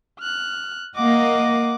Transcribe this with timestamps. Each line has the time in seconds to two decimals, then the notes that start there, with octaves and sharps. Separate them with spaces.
0.20 F6 F#6
0.95 A#3 D#5 F#5 D6